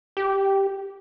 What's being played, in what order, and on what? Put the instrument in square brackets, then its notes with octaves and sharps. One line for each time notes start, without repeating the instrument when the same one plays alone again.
[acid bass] G4